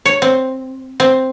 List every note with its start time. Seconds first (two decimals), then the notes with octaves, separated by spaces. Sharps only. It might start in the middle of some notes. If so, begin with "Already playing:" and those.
0.05 C#5
0.22 C4
1.00 C4